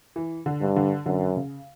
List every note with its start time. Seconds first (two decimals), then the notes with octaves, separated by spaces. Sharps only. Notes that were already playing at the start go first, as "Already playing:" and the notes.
0.16 E3
0.46 D3
0.61 G2
0.76 D3
1.06 F#2 D3
1.36 C#3